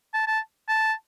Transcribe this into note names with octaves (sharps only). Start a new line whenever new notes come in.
A5
A5
A5